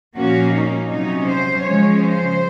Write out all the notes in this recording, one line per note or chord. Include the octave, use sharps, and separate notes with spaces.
A#2 F3 A#3 C#4 F#4
D#4
C3 F#3 C#4 D#4
C5
C#3 F3 G#3 C#4 C#5
C5